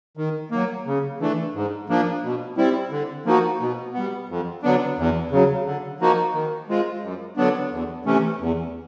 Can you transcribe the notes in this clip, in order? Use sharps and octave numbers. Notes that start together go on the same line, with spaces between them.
D#3
F#3 A#3
C#3
E3 A3 D4
G#2
F3 A#3 D4
B2
G3 C4 E4
D3
F3 A#3 D#4 F#4
B2
G3 B3
F2
D3 F#3 B3 D4
E2
C#3 F#3
D3
F3 A#3 D#4 F#4
D#3
G#3 C4 F4
F#2
D3 F#3 B3 D4
E2
C3 E3 A3 C#4
E2